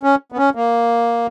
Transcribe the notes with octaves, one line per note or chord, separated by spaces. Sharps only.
C#4
B3
C#4
A#3